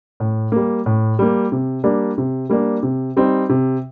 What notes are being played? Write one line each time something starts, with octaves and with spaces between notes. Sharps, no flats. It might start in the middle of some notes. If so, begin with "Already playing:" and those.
A2
G3 A#3
A2
G3 A#3
C3
G3 A#3 D4
C3
G3 A#3 D4
C3
G3 C4 D#4
C3